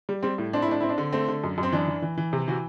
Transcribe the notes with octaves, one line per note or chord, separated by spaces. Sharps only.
G3
G3 C4
A2
C4 D4
E4
A2 D4
C4 E4
D4
D3
A3 C4
D3
F#2
F#2
C4
E3 D4
E3
E3
E3
C3
E3 F#4